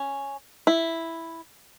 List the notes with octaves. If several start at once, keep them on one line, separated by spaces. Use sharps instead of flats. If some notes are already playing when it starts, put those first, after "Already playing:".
Already playing: C#4
E4